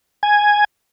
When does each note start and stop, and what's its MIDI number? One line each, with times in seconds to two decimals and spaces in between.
0.23 0.64 80